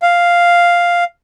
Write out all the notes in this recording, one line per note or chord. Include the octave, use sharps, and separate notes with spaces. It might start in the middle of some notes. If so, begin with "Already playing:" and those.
F5